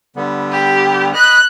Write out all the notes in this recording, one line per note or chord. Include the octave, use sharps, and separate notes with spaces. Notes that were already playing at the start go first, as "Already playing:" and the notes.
D3 G3 B3
G4
D#5 B5 F#6